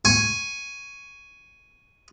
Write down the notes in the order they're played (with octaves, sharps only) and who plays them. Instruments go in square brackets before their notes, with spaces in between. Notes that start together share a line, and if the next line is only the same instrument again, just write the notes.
[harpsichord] G#5 C#6